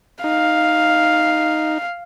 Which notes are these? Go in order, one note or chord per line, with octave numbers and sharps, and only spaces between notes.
D#4 F5